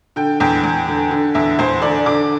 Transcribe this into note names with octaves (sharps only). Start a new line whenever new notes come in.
D3 G5
E2 G5
E2
D3
D3
E2 E5
E2 C5
D3 D5
D3 D6